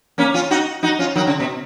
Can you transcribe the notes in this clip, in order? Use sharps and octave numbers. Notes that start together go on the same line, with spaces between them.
A#3 C#4
C#4 F4
D#4 F#4
D#4 F#4
C#4 F4
D#3 F#3
C#3
B2